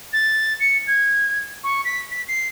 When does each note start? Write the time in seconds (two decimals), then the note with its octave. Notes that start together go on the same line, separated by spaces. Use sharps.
0.12 A6
0.60 C#7
0.87 G#6
1.63 C#6
1.84 B6
2.11 B6
2.27 C7